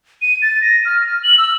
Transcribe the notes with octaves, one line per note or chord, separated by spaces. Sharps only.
D#7
A6
A#6
F6
F#7
E6